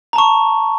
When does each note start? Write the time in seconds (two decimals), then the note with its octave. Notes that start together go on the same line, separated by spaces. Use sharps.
0.13 A#5
0.16 A5
0.18 C#6